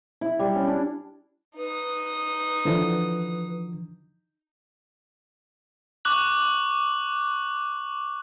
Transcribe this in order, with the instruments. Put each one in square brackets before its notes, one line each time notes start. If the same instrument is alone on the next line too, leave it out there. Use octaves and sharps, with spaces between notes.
[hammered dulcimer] E4
G3
C#4
D4
[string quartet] D#4 D#6 [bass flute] B4
[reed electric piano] D3 E3 F3
[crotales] C#6 D6 F#6 F#7